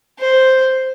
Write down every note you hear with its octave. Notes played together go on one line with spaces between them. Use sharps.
C5